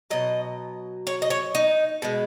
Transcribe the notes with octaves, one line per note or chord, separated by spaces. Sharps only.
B2 F#3 D#5
C#5
D#5
C#5
D#4
B2 G#3